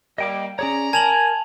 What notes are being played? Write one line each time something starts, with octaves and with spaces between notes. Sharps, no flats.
G3 A#3 D#5 G5 D6
C#4 G#4 C#5 D5 A#5
A#4 G#5 A5 F7 F#7